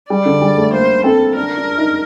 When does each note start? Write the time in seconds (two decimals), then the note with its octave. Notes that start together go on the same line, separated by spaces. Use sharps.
0.10 G3 D5
0.26 D3
0.42 G3
0.57 A3
0.73 A#3 C5
1.04 C4 A4
1.36 D4 A#4
1.57 D4
1.78 D#4